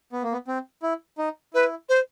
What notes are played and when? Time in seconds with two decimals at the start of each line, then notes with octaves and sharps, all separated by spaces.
0.13 B3
0.23 A#3
0.32 B3
0.48 C4
0.83 E4
1.18 D#4
1.54 E4 B4
1.89 C5